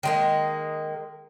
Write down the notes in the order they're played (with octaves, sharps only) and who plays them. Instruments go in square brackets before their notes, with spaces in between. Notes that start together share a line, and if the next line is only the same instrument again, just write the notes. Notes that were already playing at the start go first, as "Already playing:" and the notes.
[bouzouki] D#3 G#3 A#3